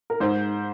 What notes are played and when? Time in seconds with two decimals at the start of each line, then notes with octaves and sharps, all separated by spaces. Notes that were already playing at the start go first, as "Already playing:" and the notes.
0.10 A#4
0.20 G#2 C5